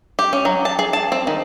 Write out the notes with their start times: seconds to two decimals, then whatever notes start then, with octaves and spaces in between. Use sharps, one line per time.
0.19 G4
0.33 C#4
0.45 F#3
0.65 A5
0.79 G#4
0.93 A5
1.12 C4
1.27 D#3